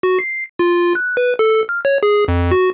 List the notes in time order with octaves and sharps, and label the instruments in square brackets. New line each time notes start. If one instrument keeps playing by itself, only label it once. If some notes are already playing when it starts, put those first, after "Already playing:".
[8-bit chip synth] F#4
C7
F4
F#6
B4
A4
F6
C#5
G#4
F2
F#4